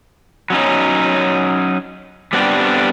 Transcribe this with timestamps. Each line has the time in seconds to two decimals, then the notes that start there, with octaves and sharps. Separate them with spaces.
0.50 F#3 C#4 D#4
2.33 G3 B3 C4 D4 G4